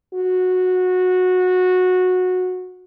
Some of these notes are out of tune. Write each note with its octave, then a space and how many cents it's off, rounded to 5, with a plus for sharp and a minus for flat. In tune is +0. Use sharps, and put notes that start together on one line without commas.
F#4 -15